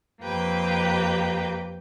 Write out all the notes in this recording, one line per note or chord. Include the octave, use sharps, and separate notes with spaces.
F2 A#3 G4 B4 G5